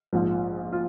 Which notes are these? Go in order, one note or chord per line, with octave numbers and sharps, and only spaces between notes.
A#1 G#2 F3
F4